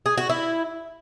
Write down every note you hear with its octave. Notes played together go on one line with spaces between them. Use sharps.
G#4
F#4
E4